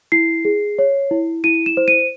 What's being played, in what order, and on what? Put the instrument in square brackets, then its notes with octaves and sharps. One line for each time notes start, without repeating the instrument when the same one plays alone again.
[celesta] E4 C7
G#4
C#5
E4
E4 D#7
E7
C5
D#7